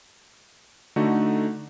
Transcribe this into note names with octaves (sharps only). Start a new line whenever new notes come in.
D3 A3 D#4 F#4